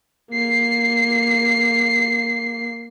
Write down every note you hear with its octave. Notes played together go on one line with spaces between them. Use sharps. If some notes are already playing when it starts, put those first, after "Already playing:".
A#3 C7